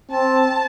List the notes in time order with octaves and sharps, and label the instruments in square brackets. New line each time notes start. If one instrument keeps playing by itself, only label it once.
[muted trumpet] C4 [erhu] A5